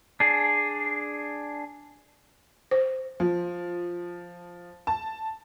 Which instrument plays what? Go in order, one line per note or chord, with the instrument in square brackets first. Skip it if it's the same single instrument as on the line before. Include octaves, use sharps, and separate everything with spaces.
[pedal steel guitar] D4 G#4
[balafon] C5
[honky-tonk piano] F3
A5